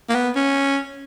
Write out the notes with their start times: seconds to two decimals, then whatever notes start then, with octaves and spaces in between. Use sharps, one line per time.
0.09 A#3
0.15 B3
0.36 C#4